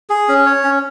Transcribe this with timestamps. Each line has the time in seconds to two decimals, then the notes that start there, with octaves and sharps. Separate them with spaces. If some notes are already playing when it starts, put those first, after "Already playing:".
0.10 G#4
0.28 C#4
0.46 C#5
0.64 C#4